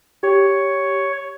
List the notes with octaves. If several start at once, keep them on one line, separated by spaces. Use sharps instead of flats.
G4 C#5